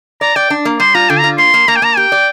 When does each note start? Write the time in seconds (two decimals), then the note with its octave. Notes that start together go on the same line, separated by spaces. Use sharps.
0.21 D5 A#5
0.36 D5 G5
0.50 D4
0.65 A#3
0.80 G3 C6
0.95 F4 A#5
1.10 D3 G5
1.19 F4 A#5
1.38 A#3 C6
1.54 A#3
1.68 A#3 A#5
1.76 G5
1.82 A#3 A#5
1.97 G4 G5
2.12 D5